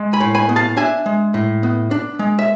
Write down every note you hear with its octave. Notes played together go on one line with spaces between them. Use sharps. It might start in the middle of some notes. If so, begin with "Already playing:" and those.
Already playing: G#3
G#5 B5
A2
G#5 B5
B3
F5 A5
D4 E5 G#5
G#3
A2
B3
D4
G#3
E5